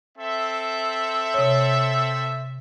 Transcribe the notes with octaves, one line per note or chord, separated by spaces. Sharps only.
C4 A4 E5
C3 C#5